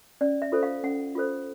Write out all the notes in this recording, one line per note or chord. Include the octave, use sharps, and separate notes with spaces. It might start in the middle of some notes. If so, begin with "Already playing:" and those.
C#4 D5
E5
F4 A4 C5
F5
C#4 F#5
F4 A4 C5